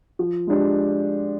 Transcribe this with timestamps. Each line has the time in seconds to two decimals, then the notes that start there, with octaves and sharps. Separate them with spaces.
0.19 F3
0.47 G#3 D4 G4